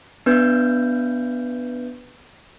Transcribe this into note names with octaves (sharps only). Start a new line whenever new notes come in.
B3 D4 B4 E5 G6